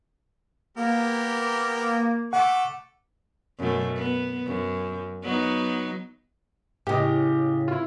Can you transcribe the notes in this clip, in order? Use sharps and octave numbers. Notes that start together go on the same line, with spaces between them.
A#3 B3 G4 A#4
A3 A4 F#5 D6
F#2 B2 A3
B3
F#2
F#3 B3 D#4
A2 C#3 G4 D#5
E4 F4